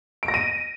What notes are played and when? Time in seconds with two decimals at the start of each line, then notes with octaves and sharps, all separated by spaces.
0.23 D7
0.28 A#6
0.34 D#7